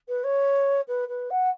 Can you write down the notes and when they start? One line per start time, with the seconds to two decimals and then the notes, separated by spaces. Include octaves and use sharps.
0.08 B4
0.24 C#5
0.88 B4
1.08 B4
1.30 F#5